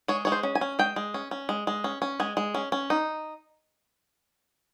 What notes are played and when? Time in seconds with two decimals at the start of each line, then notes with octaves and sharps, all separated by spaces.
0.08 G#3 C#5
0.25 G#3 C#5
0.32 C5
0.43 C#4
0.55 G#5
0.61 C#4
0.79 G#3 G5
0.96 G#3
1.14 C#4
1.31 C#4
1.49 G#3
1.67 G#3
1.84 C#4
2.02 C#4
2.20 G#3 G#5
2.37 G#3
2.55 C#4
2.72 C#4
2.90 D#4